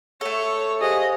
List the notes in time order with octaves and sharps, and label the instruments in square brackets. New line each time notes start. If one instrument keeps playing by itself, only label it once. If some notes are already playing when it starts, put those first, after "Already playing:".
[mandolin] A3 A4 [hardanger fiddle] C#5
[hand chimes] G4 C5 F5 [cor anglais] G#4 [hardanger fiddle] D#5